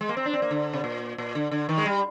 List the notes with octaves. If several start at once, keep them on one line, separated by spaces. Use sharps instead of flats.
G#3
A#3
C4
D4
C4
A#3
D3
C3
A#2
A#2
D3
D3
D#3
G#3
G3